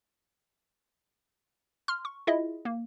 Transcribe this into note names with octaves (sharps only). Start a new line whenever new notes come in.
C6 F6
C#6
E4 F4 G#4 D#5 E5
A#3